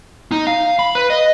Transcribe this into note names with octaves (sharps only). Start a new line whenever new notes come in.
D#4
F5
B5
B4
D#5